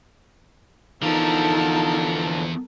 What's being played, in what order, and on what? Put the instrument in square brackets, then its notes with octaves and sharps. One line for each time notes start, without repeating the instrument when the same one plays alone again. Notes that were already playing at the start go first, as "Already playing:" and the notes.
[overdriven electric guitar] D3 F3 [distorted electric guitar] E3 B3 [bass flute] D#4 [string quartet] A4 A#4 A5